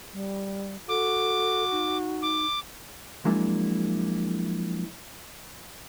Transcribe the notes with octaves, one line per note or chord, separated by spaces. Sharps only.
G3
F#4 A4 D6
D#4
D6
F3 F#3 G#3 A#3 D4 E4